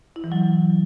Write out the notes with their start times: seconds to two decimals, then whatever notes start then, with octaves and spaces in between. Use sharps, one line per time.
0.16 E4
0.24 E3
0.32 F#3